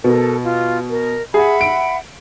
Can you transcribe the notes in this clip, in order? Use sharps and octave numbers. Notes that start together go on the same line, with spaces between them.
B2 A4 A#4
F4
A#4
G#4 E5 F#5 B5
D7